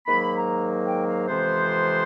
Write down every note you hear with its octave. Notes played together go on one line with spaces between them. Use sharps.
G#2 D#3 F#3 A#3 B5
A#5
G5
F5
F2 C3 E3 G#3 B3 C5